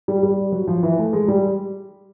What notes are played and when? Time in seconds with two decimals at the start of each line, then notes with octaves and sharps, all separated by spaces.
0.08 G3
0.23 G3
0.52 F#3
0.68 F3
0.83 E3
0.98 A3
1.13 G#3
1.28 G3